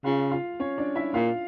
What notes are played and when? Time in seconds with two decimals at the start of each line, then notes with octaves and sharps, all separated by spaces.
0.04 C#3 F4 F5
0.31 F4 F5
0.60 C#4 C#5
0.78 D4 D5
0.95 E4 E5
1.14 A#2 F4 F5